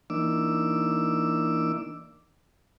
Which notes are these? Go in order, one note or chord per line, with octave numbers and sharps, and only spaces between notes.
E3 A#3 D4 D#4 D6 E6